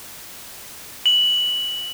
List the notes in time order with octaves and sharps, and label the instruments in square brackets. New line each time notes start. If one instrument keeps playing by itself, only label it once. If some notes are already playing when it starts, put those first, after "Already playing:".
[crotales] F#7